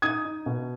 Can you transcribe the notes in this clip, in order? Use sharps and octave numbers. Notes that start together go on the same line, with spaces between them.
D#4 D#6 G#6
D#4
B2